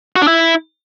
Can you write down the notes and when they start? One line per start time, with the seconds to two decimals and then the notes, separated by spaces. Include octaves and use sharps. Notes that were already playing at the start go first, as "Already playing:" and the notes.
0.16 F#4
0.22 D4
0.28 E4